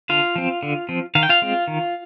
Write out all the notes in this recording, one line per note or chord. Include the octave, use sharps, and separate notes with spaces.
D3 F4 F5
F3 C4
D3
F3 C4
D#3 F5
G5
F4 F5
G#3 C4
D#3